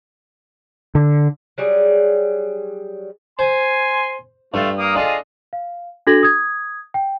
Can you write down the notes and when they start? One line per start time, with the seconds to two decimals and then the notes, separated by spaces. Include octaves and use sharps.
0.95 D3
1.58 F#3 G3 G#4
3.39 C5 G#5 C6
4.54 G2 A3 F4
4.78 A#3 D#6
4.95 D4 F4 G#4 A4 D#5
5.53 F5
6.07 D4 F#4 A4 G#6 A#6 F#7
6.23 D#6 G#6
6.94 G5